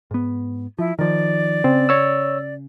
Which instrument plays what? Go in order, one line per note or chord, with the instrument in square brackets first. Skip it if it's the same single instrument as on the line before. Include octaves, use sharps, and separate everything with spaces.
[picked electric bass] G#2 B3
[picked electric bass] F3 [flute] E4
[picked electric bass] D#3 F3 [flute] D5
[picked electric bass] C#3 [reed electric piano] C4
[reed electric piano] C#5 E6